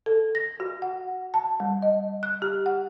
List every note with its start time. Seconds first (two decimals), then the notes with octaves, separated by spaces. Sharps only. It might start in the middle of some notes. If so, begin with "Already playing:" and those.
0.06 A4
0.35 A#6
0.60 F#4
0.82 F#5
1.34 A5
1.60 G3
1.82 D#5
2.23 F#6
2.42 G4
2.66 F#5